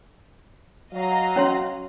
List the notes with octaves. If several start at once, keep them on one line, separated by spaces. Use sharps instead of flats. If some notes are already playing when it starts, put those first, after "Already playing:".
F#3 D#5 F5 A#5
C#4 C#5 C6